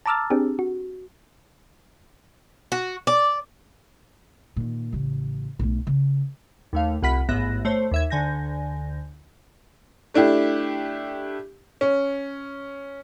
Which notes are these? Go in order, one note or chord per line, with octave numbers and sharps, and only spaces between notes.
A5 A#5 D6 E6 F6 A6
C4 D4 G4 G#4
F#4
F#4
D5
A#2 D#3
A1 C#3
B1 A3
C#3
D#2 A3 F5
C2 F4 F#5 B5 B6
A1 G#2 B3 E5 F#6 A#6
A3 C5 C#5
D#2 E5 G#6
D2 D3 G#5 G6 A#6
A3 D4 E4 G4
C#4